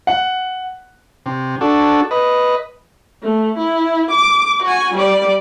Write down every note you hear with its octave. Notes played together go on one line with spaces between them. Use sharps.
F#5
C3
D4 F#4 A4
B4 D#5
A3
E4
D6
F#4 G#5
G3 D5